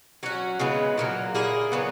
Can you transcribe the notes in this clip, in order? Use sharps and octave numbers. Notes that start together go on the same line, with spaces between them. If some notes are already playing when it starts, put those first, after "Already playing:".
F#3 C#4 F#4
C#3 E3 G#3 B3
A#2 F#3 A#3
A#2 A#3 E4 G#4
C#3 F#3 B3